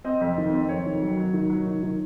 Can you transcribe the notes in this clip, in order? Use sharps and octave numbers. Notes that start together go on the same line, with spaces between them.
C4 D#5
F2
D#3
C4
F2 C#5
D#3
F#3
F#3
D#3
F#3
D#3
D#3